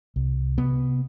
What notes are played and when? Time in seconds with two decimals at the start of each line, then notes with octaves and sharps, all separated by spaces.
0.16 C2
0.57 C3 B3